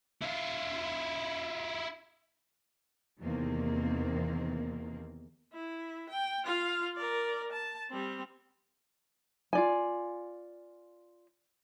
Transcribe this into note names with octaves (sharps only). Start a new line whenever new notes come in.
E4 F4
E2 C3 D#3 A#3 C4
E4
G5
F4 F5
A#4 D5
A5
G3 C4
F4 D5 G#5